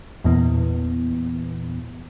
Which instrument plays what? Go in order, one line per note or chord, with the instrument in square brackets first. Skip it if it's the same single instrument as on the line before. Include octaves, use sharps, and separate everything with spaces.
[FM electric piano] E2 A#2 E3 B3